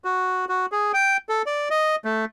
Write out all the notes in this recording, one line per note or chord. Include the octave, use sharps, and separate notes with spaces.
F#4
F#4
G#4
G5
A4
D5
D#5
A3